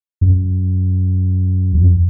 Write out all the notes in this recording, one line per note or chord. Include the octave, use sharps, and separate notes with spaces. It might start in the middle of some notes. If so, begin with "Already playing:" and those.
F#2
F2